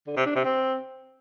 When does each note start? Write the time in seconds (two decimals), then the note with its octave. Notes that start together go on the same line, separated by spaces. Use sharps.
0.07 D3
0.16 C3
0.26 D4
0.35 C3
0.45 C4